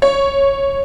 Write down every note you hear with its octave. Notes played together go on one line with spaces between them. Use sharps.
C#5